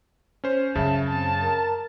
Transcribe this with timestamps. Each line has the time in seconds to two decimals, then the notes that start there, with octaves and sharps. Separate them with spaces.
0.44 C#4 C5
0.75 F#2 C#3 E5 A5
1.08 C4 A5
1.41 A#4